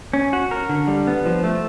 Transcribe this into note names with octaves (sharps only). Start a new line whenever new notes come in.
C#4
F#4
A#4
D3
G3
B3
F3
A3